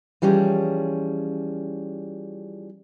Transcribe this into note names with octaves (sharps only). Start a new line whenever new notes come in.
E3 F3 G3 C#4 G#4